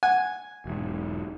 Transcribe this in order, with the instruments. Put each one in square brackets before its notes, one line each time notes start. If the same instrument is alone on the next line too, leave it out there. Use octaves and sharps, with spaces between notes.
[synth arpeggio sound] F#5 [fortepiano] G#5
[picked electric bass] E1 G#2